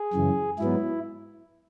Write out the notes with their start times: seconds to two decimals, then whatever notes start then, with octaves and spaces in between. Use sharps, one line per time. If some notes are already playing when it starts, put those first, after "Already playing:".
Already playing: G#4
0.14 F#2 C#3 E3
0.59 G#2 F#3 B3 E4